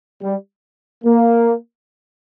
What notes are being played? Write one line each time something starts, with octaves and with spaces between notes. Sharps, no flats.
G3
A#3